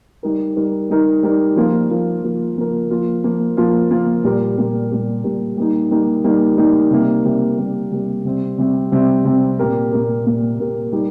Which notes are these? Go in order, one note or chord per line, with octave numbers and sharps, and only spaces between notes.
G3 D#4 A#4
G3 D#4 A#4
G3 D#4 A#4
G3 D#4 A#4
F3 A#3 F4 A#4
F3 A#3 F4 A#4
F3 A#3 F4 A#4
F3 A#3 F4 A#4
F3 A#3 F4
F3 A#3 F4
F3 A#3 F4
F3 A#3 F4
A#2 G3 A#3 G4 A#4
A#2 G3 A#3 G4 A#4
A#2 G3 A#3 G4 A#4
A#2 G3 A#3 G4 A#4
G3 A#3 D#4
G3 A#3 D#4
G3 A#3 D#4
G3 A#3 D#4
C3 G3 A#3
C3 G3 A#3
C3 G3 A#3
C3 G3 A#3
C3 G3 C4
C3 G3 C4
C3 G3 C4
C3 G3 C4
A#2 A#3 G4 A#4
A#2 A#3 G4 A#4
A#2 A#3 G4 A#4
A#2 A#3 G4 A#4
G3 D#4 G4 A#4